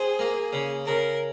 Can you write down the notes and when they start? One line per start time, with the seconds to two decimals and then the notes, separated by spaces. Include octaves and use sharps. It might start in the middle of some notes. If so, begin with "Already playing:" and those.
Already playing: C4 G#4
0.19 A#3
0.53 C#3
0.86 C#3 A#4